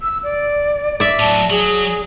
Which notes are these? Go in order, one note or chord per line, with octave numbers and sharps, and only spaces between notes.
E6
D5
D5 E5
A2 F#3 A5
F#3 G#4